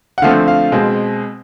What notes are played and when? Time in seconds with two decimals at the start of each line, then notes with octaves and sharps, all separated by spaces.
0.18 F#5
0.22 D3 F3 A3 C4 F5
0.48 F5
0.72 B2 G#3 C4